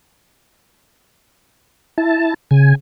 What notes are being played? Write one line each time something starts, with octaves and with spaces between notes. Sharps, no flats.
E4 A5
C#3 G#5